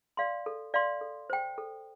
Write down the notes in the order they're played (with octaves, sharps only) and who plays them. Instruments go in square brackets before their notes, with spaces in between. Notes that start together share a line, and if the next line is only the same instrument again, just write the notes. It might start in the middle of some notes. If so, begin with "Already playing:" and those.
[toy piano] D5 F5 C6
A4
D5 F5 C6
A4
C5 G5
A4